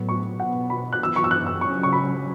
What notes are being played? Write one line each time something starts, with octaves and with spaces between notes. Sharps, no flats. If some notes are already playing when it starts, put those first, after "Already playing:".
Already playing: A2 F#3 B3
C#6
B2 B3 F#5
B5
F#6
F#2 E3 B3 E6
C#6
E6
F#6
E6
C#3 F#3 C#4 C#6
C#6
B5